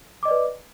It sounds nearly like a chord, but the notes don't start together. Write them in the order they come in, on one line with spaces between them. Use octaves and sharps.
D6 D#5 D5 B4